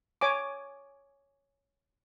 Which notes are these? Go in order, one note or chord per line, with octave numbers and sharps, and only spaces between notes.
C#5 G#5 D6